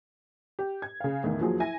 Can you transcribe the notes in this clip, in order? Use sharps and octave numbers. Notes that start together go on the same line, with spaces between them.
G4
G#6
C#3 F5
E2 A2 D#3
D#2 F3 F#3 G#4
E4 G#5 A#6